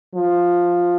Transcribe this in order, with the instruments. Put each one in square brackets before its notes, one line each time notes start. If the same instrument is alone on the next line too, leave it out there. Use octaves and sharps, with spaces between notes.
[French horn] F3